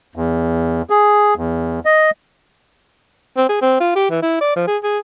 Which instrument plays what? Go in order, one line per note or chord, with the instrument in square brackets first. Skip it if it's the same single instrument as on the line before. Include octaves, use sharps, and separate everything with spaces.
[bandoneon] E2
G#4
E2
D#5
[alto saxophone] C4
G#4
C4
F4
G4
E3
E4
D5
F3
G#4
G#4